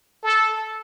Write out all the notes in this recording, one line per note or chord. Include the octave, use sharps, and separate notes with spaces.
A4